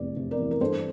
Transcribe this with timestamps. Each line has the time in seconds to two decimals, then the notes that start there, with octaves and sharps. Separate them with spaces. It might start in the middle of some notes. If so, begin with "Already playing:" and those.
Already playing: F1 E2 D5
0.16 C3
0.31 A#4 D5
0.39 E3
0.51 A#4
0.61 G2 A4 C5